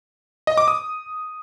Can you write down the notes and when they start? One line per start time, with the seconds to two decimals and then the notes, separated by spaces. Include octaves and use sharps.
0.47 D#5
0.57 D6
0.68 D#6